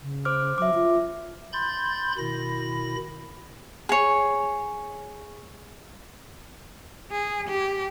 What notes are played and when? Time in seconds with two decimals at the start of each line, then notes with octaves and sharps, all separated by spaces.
0.01 C#3
0.25 C5 D6 F6
0.58 F#3 E5 D6
0.74 F4
1.53 B5 C6 G6 A6
2.18 B2 D#3 E4 B5 A#6
3.89 G#4 C#5
7.12 G#4
7.49 G4